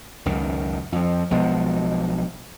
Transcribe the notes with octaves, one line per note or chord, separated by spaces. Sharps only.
C#2 F#2 D#3
F2 F3
B1 B2 F3 G#3